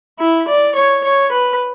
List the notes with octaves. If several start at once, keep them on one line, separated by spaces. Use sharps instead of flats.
E4
D5
C#5
C#5
B4